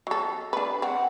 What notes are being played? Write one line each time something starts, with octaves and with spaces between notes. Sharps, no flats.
F#3 A4
D4 B4
C4 F#5